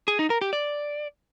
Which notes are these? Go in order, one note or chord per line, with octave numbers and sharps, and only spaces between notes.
G#4
D#4
A#4
G4
D5